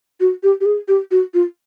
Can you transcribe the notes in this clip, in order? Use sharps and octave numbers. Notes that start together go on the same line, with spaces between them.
F#4
G4
G4
G#4
G4
F#4
F4